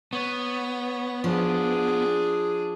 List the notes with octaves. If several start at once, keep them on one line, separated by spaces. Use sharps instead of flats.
B3 C#5
F3 D4 G#4